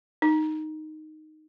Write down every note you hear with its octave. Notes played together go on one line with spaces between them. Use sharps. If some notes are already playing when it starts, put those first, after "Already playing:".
D#4